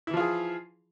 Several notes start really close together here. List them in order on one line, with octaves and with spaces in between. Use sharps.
E4 E3 F3 F4 G#4